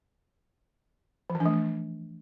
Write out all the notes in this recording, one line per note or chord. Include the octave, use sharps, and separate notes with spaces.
F3
E3
D4
A3